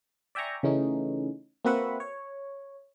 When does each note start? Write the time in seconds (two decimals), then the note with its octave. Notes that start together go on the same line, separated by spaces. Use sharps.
0.35 D5 E5 G5 G#5 A#5 C#6
0.63 C#3 E3 A3 C#4 D#4
1.65 A#3 C4 F#4 B4 E5 F#5
2.00 C#5